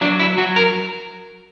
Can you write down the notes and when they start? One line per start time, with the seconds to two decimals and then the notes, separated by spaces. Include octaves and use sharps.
0.01 F#3 D4
0.20 E4
0.38 F#3 F#4
0.56 A#4